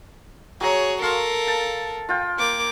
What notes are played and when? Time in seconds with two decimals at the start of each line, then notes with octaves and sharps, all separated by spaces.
0.61 F#3 G#4 C#5 A#5
1.02 A4 A#4 F5 C6
1.47 A5
2.09 F4 G5
2.38 A#3 D6